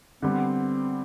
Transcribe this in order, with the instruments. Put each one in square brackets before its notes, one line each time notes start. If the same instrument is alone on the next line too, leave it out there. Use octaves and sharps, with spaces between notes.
[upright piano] D3 G3 B3 [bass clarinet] C4